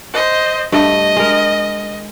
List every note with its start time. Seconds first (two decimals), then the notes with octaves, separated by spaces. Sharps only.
0.13 C5 D#5
0.72 G2 A3 D#5
1.16 G#3 A#4